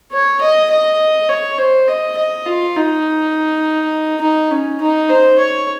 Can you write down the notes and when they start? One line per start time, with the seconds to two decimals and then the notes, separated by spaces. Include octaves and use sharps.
0.12 C#5
0.41 D#5
0.70 D#5
1.29 C#5
1.58 C5
1.88 D#5
2.17 D#5
2.46 F4
2.76 D#4
4.21 D#4
4.51 C#4
4.81 D#4
5.09 C5
5.38 C#5